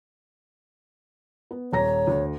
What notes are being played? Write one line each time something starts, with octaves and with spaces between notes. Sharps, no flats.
B3
D#1 C#5 A#5 A#6
D2